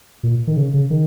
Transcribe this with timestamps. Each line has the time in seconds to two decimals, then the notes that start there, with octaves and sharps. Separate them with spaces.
0.23 A#2
0.47 D#3
0.57 C#3
0.74 C#3
0.90 D#3